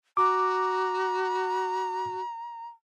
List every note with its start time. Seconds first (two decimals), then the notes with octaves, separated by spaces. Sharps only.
0.17 F#4 A#5 D6